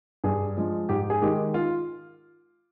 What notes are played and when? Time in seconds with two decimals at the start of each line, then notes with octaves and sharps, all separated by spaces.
0.24 G2 G#4
0.57 F3 G#3
0.89 G#2 G4
1.10 G#4
1.22 D#3 G#3 G4
1.54 F4